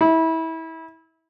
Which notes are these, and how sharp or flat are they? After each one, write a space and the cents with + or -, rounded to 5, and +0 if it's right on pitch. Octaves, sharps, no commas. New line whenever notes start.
E4 -25